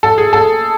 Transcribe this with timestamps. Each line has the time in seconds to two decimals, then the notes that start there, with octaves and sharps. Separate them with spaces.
0.03 A4
0.18 G#4
0.33 A4